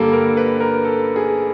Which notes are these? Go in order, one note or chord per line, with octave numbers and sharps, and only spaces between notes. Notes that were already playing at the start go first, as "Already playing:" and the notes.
Already playing: G2 D3 G3 A#3 A4
A#4
B4
A#4
A4
G#4